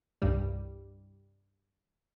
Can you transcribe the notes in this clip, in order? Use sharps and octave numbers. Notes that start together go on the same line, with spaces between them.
C2 G2 G3